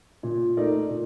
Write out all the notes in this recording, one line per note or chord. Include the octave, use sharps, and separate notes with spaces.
A#2
A3 D#4 A#4 D5
A#2